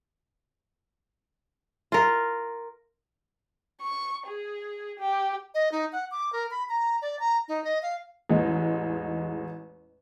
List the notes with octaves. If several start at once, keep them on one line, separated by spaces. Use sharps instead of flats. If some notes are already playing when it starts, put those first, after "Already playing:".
F4 A#4
C#6
G#4
G4
D#5
D#4
F#5
D6
A#4
B5
A#5
D5
A#5
D#4
D#5
F5
A1 E2 G#3 D#4